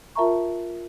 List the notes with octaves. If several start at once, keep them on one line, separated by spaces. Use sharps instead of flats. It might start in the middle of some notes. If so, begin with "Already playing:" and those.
F4 A#4 E5 A5 A#5 C#6